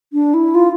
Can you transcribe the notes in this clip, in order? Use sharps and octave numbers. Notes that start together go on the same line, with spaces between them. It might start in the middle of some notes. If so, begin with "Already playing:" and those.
D4
E4
F4